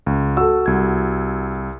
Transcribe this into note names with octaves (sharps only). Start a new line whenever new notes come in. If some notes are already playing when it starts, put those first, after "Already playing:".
C#2
F#4 A4 E6
C2 G#6